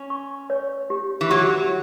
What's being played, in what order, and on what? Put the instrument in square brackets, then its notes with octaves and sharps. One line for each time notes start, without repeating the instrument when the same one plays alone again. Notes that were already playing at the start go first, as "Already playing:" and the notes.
Already playing: [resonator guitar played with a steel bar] C#4
[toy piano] C#6
C#5
G4
[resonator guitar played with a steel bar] E3
[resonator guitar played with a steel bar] F#3 [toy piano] G4